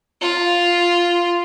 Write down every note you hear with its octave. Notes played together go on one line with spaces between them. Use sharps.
F4